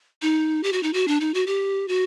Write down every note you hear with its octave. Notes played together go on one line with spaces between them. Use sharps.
D#4
G4
F#4
D#4
F#4
D4
D#4
F#4
G4
F#4